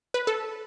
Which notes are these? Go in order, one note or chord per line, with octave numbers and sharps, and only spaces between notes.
B4
A4